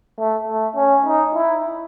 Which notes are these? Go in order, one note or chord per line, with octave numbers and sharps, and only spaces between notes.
A3
A3
C#4
D#4
E4